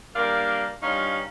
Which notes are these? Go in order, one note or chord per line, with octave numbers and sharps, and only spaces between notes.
G3 A#3 D4 A#4 D5 F5
G2 C#4 D#4 F4 F5